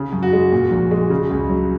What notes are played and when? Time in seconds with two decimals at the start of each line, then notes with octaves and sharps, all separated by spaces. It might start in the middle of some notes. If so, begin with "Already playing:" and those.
Already playing: C#3
0.13 F#2
0.23 F#4
0.33 G#3
0.52 A#2
0.71 A#1
0.91 G#3
1.10 C#3
1.30 C#2
1.49 F#3